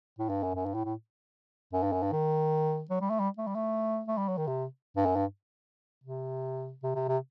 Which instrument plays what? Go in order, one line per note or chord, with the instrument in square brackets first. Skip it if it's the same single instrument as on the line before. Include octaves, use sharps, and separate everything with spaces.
[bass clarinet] A2
G2
F#2
F#2
G2
A2
A2
F#2
G2
F#2
G2
D#3
F#3
G3
A3
G3
A3
G3
A3
A3
G3
F#3
D#3
C3
G2
F#2
G2
C3
C3
C3
C3